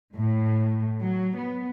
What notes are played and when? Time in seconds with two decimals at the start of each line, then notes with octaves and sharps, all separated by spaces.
0.14 A2
1.01 F#3
1.36 B3